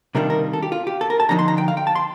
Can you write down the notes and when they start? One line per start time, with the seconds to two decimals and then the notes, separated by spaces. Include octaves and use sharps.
0.15 C3 D#3 G3 D4 F4 A#4
0.30 A#4
0.53 A4
0.63 G4
0.72 F4
0.87 G4
1.01 A4
1.10 A#4
1.20 A5
1.29 D3 F3 C4 D#4 A#5
1.39 C6
1.48 A#5
1.58 G5
1.68 F5
1.77 G5
1.87 A5
1.95 C6